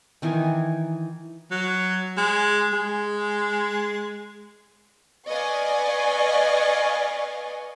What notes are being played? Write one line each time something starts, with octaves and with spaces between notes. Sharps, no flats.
D#3 E3 D#4 G#5
F#3
G#3
G#3
B4 D5 D#5 F5 G#5 C#6